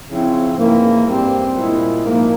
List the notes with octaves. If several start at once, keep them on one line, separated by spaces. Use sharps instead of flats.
C#3 F3 C4 E4
G#2 E3 A#3 C#4 E4
G2 G3 C4
A#2 G#3 E4
G#2 F3 A#3